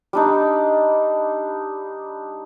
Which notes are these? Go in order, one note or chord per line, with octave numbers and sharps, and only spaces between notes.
G3 D4 D#4